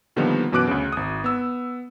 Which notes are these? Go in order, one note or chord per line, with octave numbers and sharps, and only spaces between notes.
A#2 D3 D#3 F3 G3 B3
F#2 B2 E3 D6 F#6 D7
D2 C#3
G#1 D#6
B3 E6